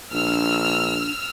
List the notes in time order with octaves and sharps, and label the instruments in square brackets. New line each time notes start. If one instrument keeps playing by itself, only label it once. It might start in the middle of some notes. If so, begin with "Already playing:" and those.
[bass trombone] A#1 [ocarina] D4 [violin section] E6 F6